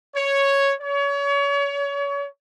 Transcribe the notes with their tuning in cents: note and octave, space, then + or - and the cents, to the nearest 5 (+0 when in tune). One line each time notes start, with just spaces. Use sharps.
C#5 +0
C#5 +30